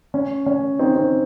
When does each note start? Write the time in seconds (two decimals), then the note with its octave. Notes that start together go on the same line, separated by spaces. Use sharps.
0.14 C#4
0.46 C#4
0.79 C4 D#4
0.96 C4